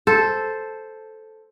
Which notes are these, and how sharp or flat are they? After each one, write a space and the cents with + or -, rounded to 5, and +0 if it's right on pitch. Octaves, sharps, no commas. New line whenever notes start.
A4 -5 C5 +0